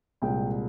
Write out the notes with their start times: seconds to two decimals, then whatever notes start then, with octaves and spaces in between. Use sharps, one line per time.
0.22 C2 A#2 G#3 G5